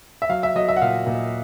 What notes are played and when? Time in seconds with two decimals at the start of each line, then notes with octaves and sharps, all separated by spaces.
0.22 E5
0.29 F#3 F5
0.43 E5
0.55 F#3 D#5
0.68 E5
0.77 F#5
0.82 A#2 F5
1.07 A#2